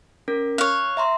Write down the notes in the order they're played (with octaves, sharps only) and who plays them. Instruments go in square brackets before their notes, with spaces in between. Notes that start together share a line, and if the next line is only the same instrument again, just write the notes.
[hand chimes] C#4 A#4
[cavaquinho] C#5 F5 [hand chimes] F#6
[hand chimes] E5 A#5 C6